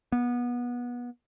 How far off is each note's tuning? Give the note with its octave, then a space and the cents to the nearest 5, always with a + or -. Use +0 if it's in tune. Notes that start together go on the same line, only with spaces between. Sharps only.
B3 -25